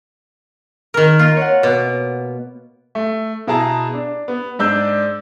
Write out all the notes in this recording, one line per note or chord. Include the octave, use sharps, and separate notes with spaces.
D#3 A#4
A#3 F4
C#5 F5 F#5
B2 D6
A3
B2 E4 G#4 A5 A#5
D4
B3
G#2 D4 D5 E6 G6